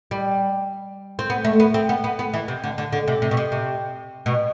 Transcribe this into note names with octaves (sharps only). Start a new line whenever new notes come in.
G3
C4
B3
A3
B3
C4
B3
B3
B3
E3
C3
D3
D3
D3
C3
C3
B2
C3
C3
B2